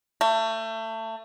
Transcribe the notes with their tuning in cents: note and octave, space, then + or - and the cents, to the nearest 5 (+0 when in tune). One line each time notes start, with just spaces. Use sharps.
A3 +25